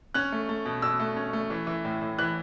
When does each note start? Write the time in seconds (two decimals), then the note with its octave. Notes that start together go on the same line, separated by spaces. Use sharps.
0.14 C#4 F#6
0.32 A3
0.49 A3
0.65 B2
0.82 B2 E6
1.00 A3
1.16 C#4
1.33 A3
1.50 E3
1.67 E3
1.85 A2
2.01 A2
2.18 E3 F#6